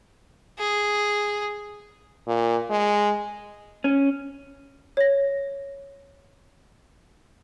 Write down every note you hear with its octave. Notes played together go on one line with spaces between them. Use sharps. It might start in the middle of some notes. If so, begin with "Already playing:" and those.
G#4
A#2
G#3
C#4
C#5 A#6